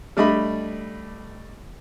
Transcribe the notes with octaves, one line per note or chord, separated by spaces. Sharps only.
G3 A3 D4 D#5 B5